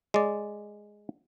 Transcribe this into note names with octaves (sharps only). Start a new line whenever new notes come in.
G#3 D5